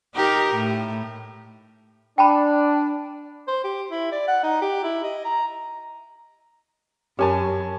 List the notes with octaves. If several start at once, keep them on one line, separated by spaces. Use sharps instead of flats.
D#4 G4 A#4
A2
D4 G5 A5 B5
C5
G4
E4
D5
F#5
D#4
G4
E4
D#5
A#5
F#2 C#4 G4 A#4 G#5 A5